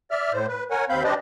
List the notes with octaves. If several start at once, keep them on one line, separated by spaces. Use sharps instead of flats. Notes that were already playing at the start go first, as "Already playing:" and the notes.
D5 E5 F6
A2 C5
B4
A#4 C#5 F#5 G#5
D#2 C4 F5 B5 G6
D4 G4 B4 C5 D5 D#5